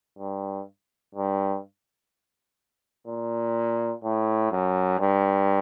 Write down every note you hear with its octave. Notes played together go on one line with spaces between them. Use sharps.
G2
G2
A#2
A2
F#2
G2